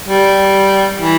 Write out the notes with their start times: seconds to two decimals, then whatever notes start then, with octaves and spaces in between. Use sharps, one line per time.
0.08 G3
0.99 E3